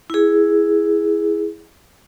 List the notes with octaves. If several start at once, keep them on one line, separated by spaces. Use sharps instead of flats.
E4 G#4